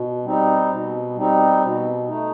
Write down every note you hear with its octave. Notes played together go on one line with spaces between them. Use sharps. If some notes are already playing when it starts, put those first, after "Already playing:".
Already playing: B2
G3 C4 D#4
B2
G3 C4 D#4
B2
A3 D#4